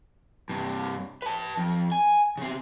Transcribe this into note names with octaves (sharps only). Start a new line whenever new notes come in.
G2 C3
B4 A5
F2
G#5
C#3 C4